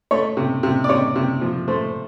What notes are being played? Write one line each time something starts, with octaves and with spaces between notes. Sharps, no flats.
A3 C#5
C3
C3
D5
C3 C#5
C3
F3
A3 C5